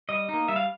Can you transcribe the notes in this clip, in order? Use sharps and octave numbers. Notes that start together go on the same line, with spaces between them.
G3 D#5
A#3 D#4
G3 E5
F5